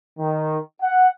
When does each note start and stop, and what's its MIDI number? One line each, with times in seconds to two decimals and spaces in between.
0.19 0.57 51
0.81 1.07 78